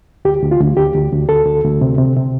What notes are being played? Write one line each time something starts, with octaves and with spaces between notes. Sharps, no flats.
D2 G4
D2
F4
D2
D2 G4
D2
D2
D2 A4
D2
D2
C3
C3
C3